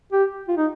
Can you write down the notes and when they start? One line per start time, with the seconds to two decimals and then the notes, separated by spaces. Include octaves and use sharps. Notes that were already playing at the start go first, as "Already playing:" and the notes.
0.12 G4
0.48 F4
0.57 D#4